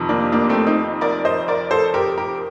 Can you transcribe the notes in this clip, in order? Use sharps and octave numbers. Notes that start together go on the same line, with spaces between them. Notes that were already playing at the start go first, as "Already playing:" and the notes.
Already playing: F2 C3 D#3
A#3 D4
A#3 D4
A3 C4
C4 D#4
A#4 D5
C5 D#5
A#4 D5
A4 C5
G4 A#4
G4 A#4